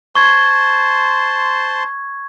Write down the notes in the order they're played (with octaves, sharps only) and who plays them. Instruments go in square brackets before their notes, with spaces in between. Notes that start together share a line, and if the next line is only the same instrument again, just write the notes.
[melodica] C5 A5 C6 [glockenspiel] C#6 G#6